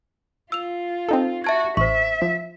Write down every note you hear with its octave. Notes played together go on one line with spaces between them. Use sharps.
F4 E6 F7
C4 D#4 A4
F#4 E5 A5 G#6
A1 C5 E5 C#6
F3